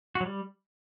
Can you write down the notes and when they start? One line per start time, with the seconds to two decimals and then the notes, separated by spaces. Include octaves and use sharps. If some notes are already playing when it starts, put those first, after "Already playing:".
0.15 F#4
0.21 F#3
0.26 G3